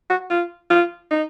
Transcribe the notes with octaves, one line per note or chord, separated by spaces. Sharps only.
F#4
F4
F4
D#4